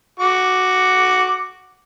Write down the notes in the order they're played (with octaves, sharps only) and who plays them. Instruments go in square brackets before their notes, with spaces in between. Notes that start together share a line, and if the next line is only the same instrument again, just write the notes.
[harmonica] F#4 D6